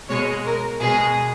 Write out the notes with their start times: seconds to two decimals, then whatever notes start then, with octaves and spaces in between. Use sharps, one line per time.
0.09 B2 G#3 C#5
0.45 A#4
0.81 B2 G#3 G#4